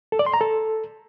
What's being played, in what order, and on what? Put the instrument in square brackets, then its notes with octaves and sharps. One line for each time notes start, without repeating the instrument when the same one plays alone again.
[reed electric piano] A4
D5
C6
A#5
A4